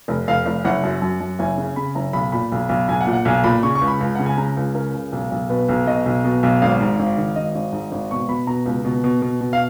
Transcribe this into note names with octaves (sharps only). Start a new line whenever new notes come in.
F1
F1 F5
F1
F#1 F#5
F#2
F#2
F#2
F#1 G#5
C#3
C#3 B5
F#1 A#5
B1 B5
A#2 B5
B1
B1
B1 G#5
F#5
A#2
F#5
B1 G#5
A#2 B5
C#3 C#6
C#6
C#2
B5
C#2
C#3 F#5
G#5
C#3 A#5
C#2
C#3 A#4
C#2
B1
B1
B2 B4
B1
B2 D#5
B1
B2
B1
G#1 F5
G#2
G#1
D#3
G#1 D#5
G#1
G#2
G#1
B2 C#6
B2 B5
B2 A#5
C#2
B2
B2
B2
B2
F5